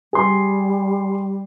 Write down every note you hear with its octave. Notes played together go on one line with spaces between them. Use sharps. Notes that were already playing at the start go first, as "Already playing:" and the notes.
G3 G#4 C6